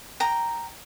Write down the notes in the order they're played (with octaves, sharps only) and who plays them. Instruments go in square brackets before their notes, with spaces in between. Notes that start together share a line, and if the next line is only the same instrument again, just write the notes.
[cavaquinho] G5 A#5